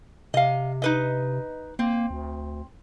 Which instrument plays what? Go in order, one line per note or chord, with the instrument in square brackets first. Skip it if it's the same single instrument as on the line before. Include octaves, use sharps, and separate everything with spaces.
[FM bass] C3 [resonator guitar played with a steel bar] D#5 F5
[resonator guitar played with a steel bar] D#4 B4 D#5
[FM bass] A#3 [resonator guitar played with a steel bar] C4
[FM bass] D2